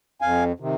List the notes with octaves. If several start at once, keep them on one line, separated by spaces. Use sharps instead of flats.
F2 F5 G#5
C3 D#3